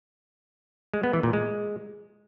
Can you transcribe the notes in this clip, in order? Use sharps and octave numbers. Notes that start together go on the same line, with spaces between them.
G#3
B3
E3
A#2
G#3